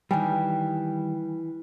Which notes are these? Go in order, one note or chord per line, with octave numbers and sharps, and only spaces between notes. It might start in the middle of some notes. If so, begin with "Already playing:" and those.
D#3 E3 G3 G5 G#5